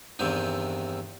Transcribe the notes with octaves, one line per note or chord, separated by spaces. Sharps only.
E2 G2 C3 D#3 E3